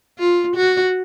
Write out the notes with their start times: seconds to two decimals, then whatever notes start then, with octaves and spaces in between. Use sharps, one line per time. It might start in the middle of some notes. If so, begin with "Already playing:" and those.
0.19 F4
0.56 F#4